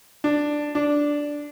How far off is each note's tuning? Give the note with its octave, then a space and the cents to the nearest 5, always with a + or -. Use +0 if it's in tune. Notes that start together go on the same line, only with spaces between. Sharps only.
D4 +5
D4 -5